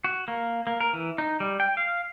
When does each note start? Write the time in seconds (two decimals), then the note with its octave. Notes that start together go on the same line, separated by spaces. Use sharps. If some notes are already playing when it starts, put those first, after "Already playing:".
0.04 F#4
0.28 A#3
0.67 A#3
0.80 A#4
0.93 E3
1.18 D#4
1.40 G3
1.60 G5
1.77 F5